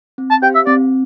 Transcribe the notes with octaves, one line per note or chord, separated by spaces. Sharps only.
C4
A5
G4 C5 F5 G5
E5
C4 D5